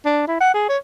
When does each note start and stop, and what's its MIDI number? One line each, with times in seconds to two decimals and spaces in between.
0.05 0.23 62
0.28 0.36 64
0.41 0.53 78
0.54 0.69 68
0.69 0.77 73